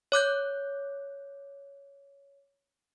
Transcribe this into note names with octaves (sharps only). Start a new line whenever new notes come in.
C#5 D6 F#6 G6